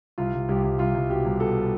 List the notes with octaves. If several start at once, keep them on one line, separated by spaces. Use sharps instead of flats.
C2 F4
C2
C2 G4
C2
C2 F4
C2
B2 G4
C2
B2 A4